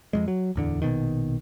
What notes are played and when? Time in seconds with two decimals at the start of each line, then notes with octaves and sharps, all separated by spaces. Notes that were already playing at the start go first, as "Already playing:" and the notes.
0.13 F2 G#2 G#3
0.28 F#3
0.56 D1 E2 D3
0.82 A#1 B2 D#3